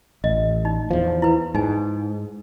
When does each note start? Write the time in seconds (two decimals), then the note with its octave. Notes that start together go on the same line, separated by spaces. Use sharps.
0.24 A1 D#5
0.65 D#4
0.91 E2 F3
1.22 E4 B4
1.55 G#2 D#4 G#5